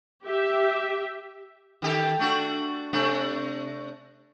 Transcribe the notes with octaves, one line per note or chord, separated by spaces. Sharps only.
G4 E5
D#3 G4 A4
A3 D4 F#4
C3 A3 D4